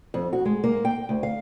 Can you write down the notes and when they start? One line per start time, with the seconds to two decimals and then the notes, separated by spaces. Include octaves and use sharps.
0.14 F2
0.33 F#4
0.45 G#3
0.64 A#3
0.85 G5
1.09 D2
1.23 F5